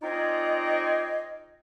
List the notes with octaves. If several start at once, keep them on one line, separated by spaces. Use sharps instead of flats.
C4 D#4 F4 G#4 D5 D#5